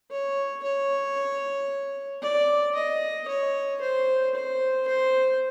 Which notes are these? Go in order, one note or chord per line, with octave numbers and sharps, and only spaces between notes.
C#5
C#5
D5
D#5
C#5
C5
C5
C5